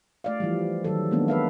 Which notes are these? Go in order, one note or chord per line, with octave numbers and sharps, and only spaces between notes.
A3 D5 F5
E3 F3 G3
D#3 F#3 A4
D#3 G#3 A#3 B3 D4
B4 E5 F5